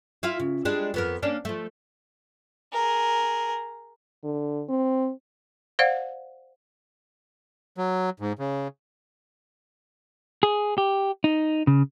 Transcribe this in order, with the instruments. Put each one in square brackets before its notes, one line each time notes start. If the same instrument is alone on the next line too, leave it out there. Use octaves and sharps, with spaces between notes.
[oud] E4 F4 F5
C#3
G3 G#3 D4
F2 B3 A#4
A#3 C#4 D4
F3 A3
[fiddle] G#4 A#4
[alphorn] D3
C4
[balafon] C5 D5 F5 F#5
[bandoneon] F#3
G#2
C#3
[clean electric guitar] G#4
G4
D#4
C#3